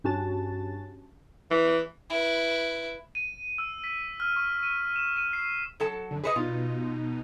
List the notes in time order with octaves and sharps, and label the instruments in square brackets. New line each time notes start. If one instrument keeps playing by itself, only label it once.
[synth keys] G2 C#4 F#4 A5 A6
[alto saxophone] E3
[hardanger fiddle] E4 B4
[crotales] D#7
E6
B6
F6
C#6
D#7
E7
D#7
C7
[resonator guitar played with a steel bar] F#3 A4 A5
[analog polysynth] F#2 D3
[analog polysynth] G#4 C#7 [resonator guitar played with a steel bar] B4 C5 D#5
[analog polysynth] B2 D#4 [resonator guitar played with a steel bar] F4